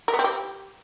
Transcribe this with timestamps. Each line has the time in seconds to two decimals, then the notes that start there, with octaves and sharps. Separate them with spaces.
0.08 A#4
0.13 B3
0.19 C4
0.24 G4